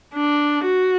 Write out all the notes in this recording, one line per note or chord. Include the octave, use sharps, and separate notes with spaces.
D4
F#4